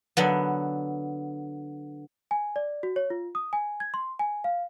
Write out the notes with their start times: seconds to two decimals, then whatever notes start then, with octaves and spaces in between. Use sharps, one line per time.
0.17 D3 F#3 B3
2.31 G#5
2.56 D5
2.83 F#4
2.96 C#5
3.10 F4
3.35 D#6
3.53 G#5
3.80 G#6
3.94 C6
4.19 G#5
4.44 F5